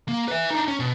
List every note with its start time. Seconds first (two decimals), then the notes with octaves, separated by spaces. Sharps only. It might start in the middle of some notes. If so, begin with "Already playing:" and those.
0.08 A#3
0.28 B4 E5
0.51 D4 D#4
0.68 C#4
0.80 B2